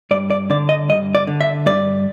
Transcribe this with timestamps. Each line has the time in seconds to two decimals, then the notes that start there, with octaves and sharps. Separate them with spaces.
0.11 G2 D5
0.30 D5
0.50 D3 D5
0.69 D#5
0.89 G2 D#5
1.15 D5
1.27 D3
1.41 E5
1.66 G2 D5